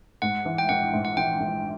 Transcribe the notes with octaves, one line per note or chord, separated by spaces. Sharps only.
G#2 F#5
E3
G5
A#1 F#5
G#2
F#5
A#1 G5
A#1